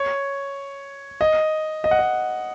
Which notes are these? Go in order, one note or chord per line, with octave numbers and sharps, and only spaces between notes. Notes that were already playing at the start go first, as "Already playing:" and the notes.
Already playing: C#5
D#5
D#5
F#5
D#5